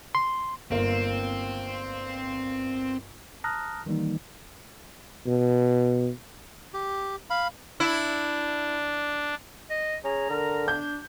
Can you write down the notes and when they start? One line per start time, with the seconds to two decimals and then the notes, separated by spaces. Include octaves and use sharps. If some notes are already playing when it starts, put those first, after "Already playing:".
0.15 C6
0.71 G1 A#3 C4
3.44 A5 A#5 D#6 F6 F#6 A#6
3.86 D#3 E3 G3 A#3 D#4
5.27 B2
6.74 G4
7.30 F5 B5
7.80 D4 E4
9.70 D#5
10.04 C#4 G#4 A#5
10.30 D3 A#4
10.68 D4 G6